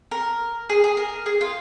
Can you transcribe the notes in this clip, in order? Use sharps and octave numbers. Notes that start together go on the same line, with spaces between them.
A#4
G#4
G#4
A#4
G#4
F4